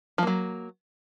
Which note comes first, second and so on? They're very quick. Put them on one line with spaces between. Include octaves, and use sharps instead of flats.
F3 A#3 F#3